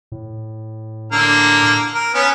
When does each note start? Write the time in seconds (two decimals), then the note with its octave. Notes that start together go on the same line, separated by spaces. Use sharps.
0.12 A2
1.12 D3 A#3
1.95 A#4
2.15 B3 C#4